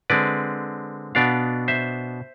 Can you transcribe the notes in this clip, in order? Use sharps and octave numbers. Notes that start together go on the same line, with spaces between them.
D3 G#3 C4 B4 D5
B2 B3 D4 D5 F5
C5 E5